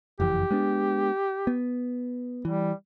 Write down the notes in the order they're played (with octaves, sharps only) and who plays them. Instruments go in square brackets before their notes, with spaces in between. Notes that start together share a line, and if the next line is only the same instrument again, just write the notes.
[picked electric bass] F#1 F2 E3 [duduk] G4
[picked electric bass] G#3 B3 D4
B3
[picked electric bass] E3 [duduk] G3